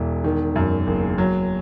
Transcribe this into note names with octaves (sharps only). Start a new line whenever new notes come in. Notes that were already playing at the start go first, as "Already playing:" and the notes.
Already playing: E1 E2 B2 E4
D#3
F#2
F#1
F#3